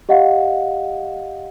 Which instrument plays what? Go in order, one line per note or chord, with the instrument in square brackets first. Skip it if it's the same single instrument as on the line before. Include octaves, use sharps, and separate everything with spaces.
[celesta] G4 D#5 F5 F#5